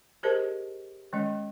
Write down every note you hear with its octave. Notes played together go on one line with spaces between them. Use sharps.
G4 G#4 A#4 C5 D#5 A5
D#3 G#3 C#4 D#5